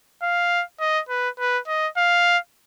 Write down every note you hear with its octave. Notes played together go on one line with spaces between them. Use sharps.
F5
D#5
B4
B4
D#5
F5